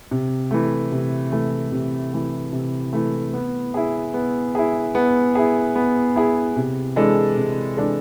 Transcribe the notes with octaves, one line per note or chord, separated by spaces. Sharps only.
C3
E3 A3
C3
E3 A3
C3
E3 A3
C3
E3 A3
B3
E4 G#4
B3
E4 G#4
B3
E4 G#4
B3
E4 G#4
C3
E3 G#3 D4 A4
C3
E3 G#3 D4 A4